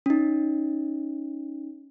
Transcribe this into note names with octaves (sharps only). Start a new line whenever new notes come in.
C#4 D#4